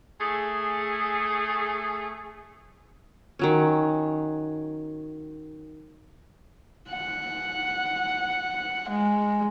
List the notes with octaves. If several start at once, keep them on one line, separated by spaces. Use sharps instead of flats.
A3 G#4
D#3 F#3 C#4
F#5
G#3